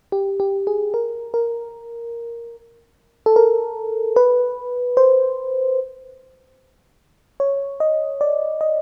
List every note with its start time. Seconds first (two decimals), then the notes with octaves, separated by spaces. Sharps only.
0.12 G4
0.40 G4
0.67 G#4
0.94 A#4
1.34 A#4
3.26 A4
3.36 A#4
4.16 B4
4.97 C5
7.40 C#5
7.80 D#5
8.21 D5
8.61 D#5